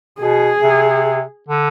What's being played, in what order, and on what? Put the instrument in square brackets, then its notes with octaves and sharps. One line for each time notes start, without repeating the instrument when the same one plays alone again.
[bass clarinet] B2 [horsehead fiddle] G#4
[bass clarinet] C3
D3